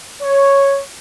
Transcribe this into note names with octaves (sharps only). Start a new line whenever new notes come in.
C#5